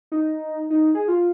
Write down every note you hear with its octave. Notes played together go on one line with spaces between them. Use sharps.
D#4
D#4
G#4
F4